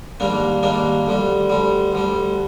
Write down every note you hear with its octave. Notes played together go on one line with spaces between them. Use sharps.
G#2 D#3 G3 A#3 D4
G#2 D#3 G3 A#3 D4
D2 D3 G3
D2 D3 G3
D2 D3 G3